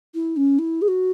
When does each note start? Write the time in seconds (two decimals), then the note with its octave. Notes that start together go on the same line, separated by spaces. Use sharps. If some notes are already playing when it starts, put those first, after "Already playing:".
0.15 E4
0.37 C#4
0.59 E4
0.82 G#4
0.88 F#4